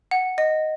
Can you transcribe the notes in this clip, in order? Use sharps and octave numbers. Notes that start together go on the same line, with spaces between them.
F#5
D#5